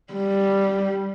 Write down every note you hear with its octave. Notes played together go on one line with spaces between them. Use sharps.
G3